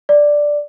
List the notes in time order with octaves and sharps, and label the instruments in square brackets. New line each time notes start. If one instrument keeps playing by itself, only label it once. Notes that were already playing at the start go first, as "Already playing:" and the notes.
[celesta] D5